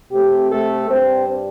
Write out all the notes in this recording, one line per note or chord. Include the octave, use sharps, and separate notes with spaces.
C3 A3 C4 G4
A3 A4
G2 G3 C4 D4 C5